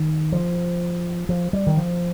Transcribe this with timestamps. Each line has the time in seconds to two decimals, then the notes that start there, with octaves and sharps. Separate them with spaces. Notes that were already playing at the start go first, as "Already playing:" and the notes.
Already playing: D#3
0.32 F3
1.29 F3
1.53 G3
1.67 D#3
1.77 F3